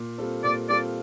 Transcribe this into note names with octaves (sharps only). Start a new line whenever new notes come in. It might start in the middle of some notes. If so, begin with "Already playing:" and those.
Already playing: A#2
G3 C4 F4 A4
A#2 D5
G3 C4 F4 A4 D5